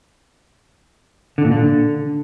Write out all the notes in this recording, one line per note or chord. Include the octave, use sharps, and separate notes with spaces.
D3
A#2
D3